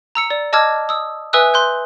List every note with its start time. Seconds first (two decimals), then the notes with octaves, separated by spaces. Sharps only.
0.15 A#5 E6 C#7
0.30 D5
0.53 D#5 A5 D6 E6 F6 G#6
0.89 D#6 E6
1.33 B4 E5 G#5 D#6 E6 F#6
1.54 C6 F#6 G6